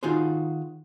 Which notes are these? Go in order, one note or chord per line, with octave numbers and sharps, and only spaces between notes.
D#3 D#4 F4 F#4 G#4 C5